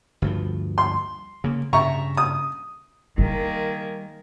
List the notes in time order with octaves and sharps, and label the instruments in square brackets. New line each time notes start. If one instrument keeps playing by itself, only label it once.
[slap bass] D2 G2 F3
[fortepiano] C6
[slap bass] C#3 A#3
[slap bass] G2 C#3 [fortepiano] E5 A#5 C#6
[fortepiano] D#6
[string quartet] D#3 A#3 G#4 [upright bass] G3